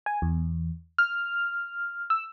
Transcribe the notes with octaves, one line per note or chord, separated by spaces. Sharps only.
G#5
E2
F6
E6